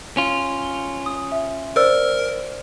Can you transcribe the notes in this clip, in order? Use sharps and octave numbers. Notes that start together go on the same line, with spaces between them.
C#4 F4
D#6
E5
A#4 C5 D5 E6